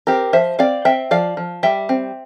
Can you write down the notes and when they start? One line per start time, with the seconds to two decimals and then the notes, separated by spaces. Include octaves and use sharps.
0.07 C4 G4 A#4
0.33 F3 C5 E5
0.59 C4 D5 F5
0.85 C4 E5 G5
1.11 F3 D5 F5
1.37 F3
1.63 G3 E5 G5
1.89 C4